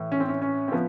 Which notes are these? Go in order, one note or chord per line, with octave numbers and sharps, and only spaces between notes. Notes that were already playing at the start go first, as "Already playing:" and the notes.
Already playing: A2 E3
C#4
C4
C#4
C#4
C4
F3 B3